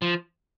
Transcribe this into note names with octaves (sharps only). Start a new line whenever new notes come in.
F3